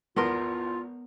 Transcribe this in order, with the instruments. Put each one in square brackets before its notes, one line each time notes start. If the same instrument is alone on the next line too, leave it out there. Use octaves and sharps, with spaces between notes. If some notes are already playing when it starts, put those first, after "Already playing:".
[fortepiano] G#1 E2 C6 [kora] B3 A#4 [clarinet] F4